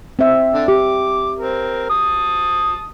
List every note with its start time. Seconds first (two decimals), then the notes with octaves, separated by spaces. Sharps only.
0.19 C4 E5
0.54 D3 D4
0.68 G4 D6
1.39 C4 A#4
1.90 A5 D#6